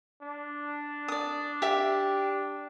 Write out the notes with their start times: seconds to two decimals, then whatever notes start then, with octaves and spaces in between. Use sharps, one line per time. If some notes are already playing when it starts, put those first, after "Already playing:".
0.22 D4
1.08 D5 D#6
1.62 G4 E5